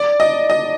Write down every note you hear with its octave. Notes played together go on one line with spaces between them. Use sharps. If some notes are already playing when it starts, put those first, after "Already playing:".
Already playing: D5
D#5
D#5